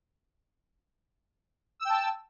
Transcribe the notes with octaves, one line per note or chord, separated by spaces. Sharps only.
G5 A5 E6